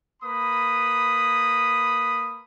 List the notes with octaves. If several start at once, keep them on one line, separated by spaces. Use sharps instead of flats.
A#3 B4 B5 D#6